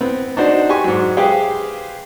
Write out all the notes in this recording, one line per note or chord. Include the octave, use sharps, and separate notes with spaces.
B3 C4
D4 D#4 F#4 C5 D5
G4 G#5 C6 C#6
G#2 F#3
G4 G#4 B4 C5 F5 G5